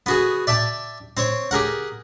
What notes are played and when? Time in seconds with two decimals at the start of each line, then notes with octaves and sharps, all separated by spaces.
0.06 B3 F#4 G#4
0.47 D5 E5 G5 A5
1.17 C4 C5 C#5
1.51 G4 G#4 A#4 F#5